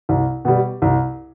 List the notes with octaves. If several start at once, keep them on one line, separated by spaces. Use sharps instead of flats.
C2
B2 G3
C2